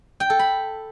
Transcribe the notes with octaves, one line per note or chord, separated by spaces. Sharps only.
G5
A4
B5